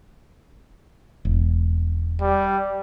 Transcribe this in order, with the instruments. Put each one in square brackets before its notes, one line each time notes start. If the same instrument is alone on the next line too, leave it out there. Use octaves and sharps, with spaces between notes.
[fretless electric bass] E1
[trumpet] G3